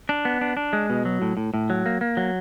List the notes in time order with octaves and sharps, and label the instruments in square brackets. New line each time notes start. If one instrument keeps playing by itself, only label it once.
[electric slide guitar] D4
B3
D4
D4
G#3
B2
F#3
A2
A2
A2
F#3
A#3
A#3
F#3